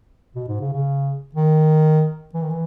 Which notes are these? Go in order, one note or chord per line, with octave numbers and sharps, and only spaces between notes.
B2
G#2
C#3
C#3
D#3
E3
D#3
E3